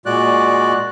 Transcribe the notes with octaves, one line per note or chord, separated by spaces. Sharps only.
A#2 G#3 F#4 D5 F#6